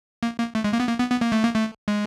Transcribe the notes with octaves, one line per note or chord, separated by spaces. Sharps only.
A#3
A#3
A3
G#3
A#3
B3
A#3
B3
B3
A#3
A3
A#3
A3
G#3